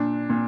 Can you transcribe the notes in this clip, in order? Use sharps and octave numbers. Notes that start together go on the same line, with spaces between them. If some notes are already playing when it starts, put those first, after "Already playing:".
Already playing: A#2 D4
A#2